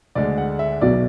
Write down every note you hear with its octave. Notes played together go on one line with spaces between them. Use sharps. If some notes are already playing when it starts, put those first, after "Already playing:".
D2 D3 G#3 D5
F#5
E5
B1 B2 F#3 D5